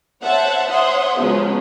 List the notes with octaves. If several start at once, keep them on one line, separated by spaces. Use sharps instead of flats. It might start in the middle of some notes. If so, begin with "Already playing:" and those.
C5 C#5 E5 F#5 A5
C5 C#5 E5 F#5 C6 D#6
C#3 F3 F#3 G#3 B3 C#4